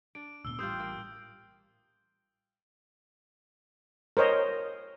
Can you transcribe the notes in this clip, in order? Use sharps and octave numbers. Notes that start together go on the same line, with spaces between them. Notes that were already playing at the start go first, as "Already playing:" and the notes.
D4 D7
D2 A#2 B3 E6 G7
A1 A2 G3 F4 G4 C5 D#6 G6
A#3
A#4 C5 C#5 D#5